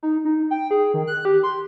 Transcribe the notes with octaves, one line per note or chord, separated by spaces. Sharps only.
D#4
D#4
G5
G#4
D#3
F#6
G4
C6